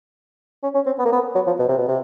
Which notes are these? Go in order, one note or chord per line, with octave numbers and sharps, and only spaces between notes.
C#4
C#4
C4
B3
A#3
B3
F#3
F3
B2
C3
B2
C3